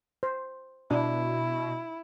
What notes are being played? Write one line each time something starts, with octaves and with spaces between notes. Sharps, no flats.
C5
B2 D4 E4